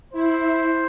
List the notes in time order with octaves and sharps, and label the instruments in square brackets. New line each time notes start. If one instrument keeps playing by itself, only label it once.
[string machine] E4 [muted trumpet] C5